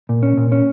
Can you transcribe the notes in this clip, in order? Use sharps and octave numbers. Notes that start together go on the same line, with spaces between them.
A#2
C#4
A#2
C#4